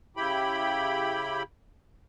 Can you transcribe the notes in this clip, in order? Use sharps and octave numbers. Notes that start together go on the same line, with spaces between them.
C#3 E4 G4 G5 B5